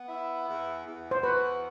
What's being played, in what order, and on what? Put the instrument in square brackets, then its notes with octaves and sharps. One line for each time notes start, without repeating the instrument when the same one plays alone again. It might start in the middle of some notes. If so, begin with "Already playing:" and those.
Already playing: [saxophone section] B3
E4
E2
E2
[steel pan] C5
[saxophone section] F#4 [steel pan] B4